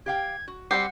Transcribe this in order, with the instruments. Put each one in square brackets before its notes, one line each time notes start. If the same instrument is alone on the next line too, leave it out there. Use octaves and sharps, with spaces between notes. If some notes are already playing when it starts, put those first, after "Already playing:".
[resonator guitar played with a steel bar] G4 F5 G5 [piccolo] G#6
[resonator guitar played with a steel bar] F#4
[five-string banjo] G3 C4 G4 [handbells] F#5 [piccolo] C7